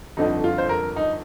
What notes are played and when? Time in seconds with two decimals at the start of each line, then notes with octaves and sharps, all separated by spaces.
0.17 G1 F2 D3 F3 D#4
0.44 F4
0.58 C5
0.69 A#4
0.96 D#4